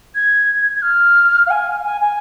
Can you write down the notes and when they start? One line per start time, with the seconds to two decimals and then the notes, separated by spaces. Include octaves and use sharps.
0.15 G#6
0.74 G#6
0.82 F6
1.47 F5
1.50 G#5
1.84 G#5
2.01 G#5